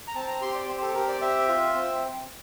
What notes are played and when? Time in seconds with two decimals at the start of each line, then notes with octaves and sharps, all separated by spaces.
0.08 A#5
0.15 C4 A5
0.28 A#5
0.42 G4 C6
0.55 D5
0.68 C4 C5
0.81 A4
0.94 G4 A#4
1.08 D5
1.21 C4 E5
1.48 F4
1.75 C4